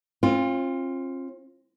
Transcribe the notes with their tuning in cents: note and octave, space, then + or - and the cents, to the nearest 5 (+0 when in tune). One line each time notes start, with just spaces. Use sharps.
C4 +40 F4 +0